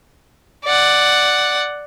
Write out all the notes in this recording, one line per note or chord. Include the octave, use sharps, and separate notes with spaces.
D5 F#5